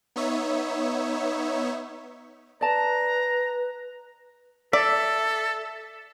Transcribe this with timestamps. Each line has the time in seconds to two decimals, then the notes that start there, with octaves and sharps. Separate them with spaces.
0.16 B3 D#4 C#5 E5
2.61 B4 D5 A5 A#5
4.73 A4 D5 E5